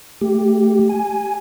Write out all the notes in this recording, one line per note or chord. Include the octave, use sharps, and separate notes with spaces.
A3 G4
G#5